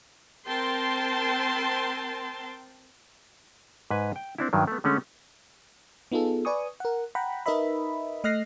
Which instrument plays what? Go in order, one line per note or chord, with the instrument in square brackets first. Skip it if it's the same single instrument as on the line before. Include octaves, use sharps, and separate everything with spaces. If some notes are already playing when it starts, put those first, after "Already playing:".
[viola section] C4 A#4 G5 A5 C6
[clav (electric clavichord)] G#2 B4 G#5
G5
C4 D4 E4
G2 D#3 F#3
A3 B3
D3 G#3 A3 C#4
[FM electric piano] B3 D#4 F4 G#4 A4
B4 D5 G#5 C#6 D#6
A#4 F#5
F#5 G5 A#5 B5
D#4 A#4 B4 D#5 E5 B5
A3 D#5 F6 F#6 A#6 C7